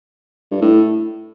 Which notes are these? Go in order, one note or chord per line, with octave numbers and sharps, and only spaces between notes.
G2
A2